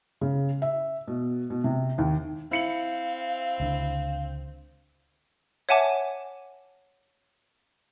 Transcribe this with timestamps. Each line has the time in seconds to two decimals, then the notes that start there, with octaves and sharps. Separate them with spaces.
0.21 C#3
0.62 E5
1.08 B2
1.50 B2
1.64 C3
1.98 D#2
2.51 C4 E4 F5 C#7 F#7
3.60 C#2 D3
5.69 C#5 E5 F#5 G#5 A5 D6